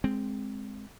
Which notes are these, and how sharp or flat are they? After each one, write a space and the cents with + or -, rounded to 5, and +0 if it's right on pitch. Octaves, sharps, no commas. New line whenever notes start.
G#3 +0 C4 +0